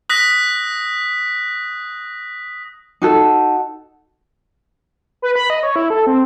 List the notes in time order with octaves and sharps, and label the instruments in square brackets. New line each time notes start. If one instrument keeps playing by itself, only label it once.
[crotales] D#6 F#6 A#6 B6
[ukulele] D#4 F#4 A4
[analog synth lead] B4
B5
D#5
C#5
E4
A4
C4